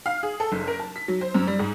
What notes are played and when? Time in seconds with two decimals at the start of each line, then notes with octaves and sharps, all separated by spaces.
0.06 F5
0.23 G#4
0.40 A4
0.52 F#1
0.67 A#4
0.79 A5
0.96 B6
1.08 F#3
1.21 C5
1.34 F#2
1.47 G3
1.59 G#2